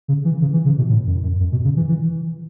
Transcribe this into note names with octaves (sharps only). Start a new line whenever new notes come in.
C#3
E3
C#3
E3
C#3
B2
A2
F#2
F#2
F#2
B2
C#3
E3
E3